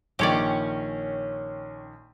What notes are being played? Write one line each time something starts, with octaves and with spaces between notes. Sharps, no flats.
A#1 D#3 C#4 G4 C#5 D5